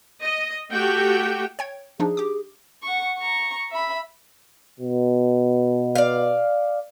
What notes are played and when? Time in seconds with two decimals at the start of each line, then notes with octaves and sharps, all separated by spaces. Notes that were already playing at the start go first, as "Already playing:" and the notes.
0.21 D#5
0.72 A3 F#4 G4 G5
1.59 C#5 G5 G#6
2.00 F3 D4 D#4 G#4
2.17 G4 D6
2.83 F#5 C#6
3.18 A#5 C#6
3.71 E5 B5
4.80 B2
5.95 D5 F5